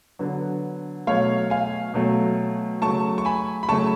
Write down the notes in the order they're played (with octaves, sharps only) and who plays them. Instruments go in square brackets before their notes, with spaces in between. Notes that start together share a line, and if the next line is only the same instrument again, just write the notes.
[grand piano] D3 F#3 B3
B2 F#3 A3 C#5 F5
F5 G#5
B2 F#3 A3
C#3 F#3 A3 A5 C#6
C#6
G#5 B5
B5
C#3 F#3 A3 A5 C#6